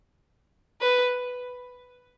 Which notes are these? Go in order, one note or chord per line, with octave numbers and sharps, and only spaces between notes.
B4